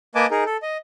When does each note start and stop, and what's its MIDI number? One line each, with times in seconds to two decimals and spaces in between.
0.15 0.27 58
0.15 0.27 71
0.15 0.27 75
0.15 0.27 80
0.15 0.27 81
0.15 0.27 86
0.31 0.44 63
0.31 0.44 68
0.31 0.44 70
0.46 0.57 69
0.62 0.77 75